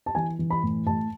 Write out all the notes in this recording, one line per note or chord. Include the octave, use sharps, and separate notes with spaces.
A5
E3 G#5
E3
B5
A2
A2 A5